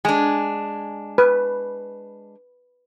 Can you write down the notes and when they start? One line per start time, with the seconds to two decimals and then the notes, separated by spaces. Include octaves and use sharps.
0.05 G#3 D4 G#5
1.18 B4